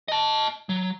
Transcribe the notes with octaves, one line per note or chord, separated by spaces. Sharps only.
D#5 A5
F#3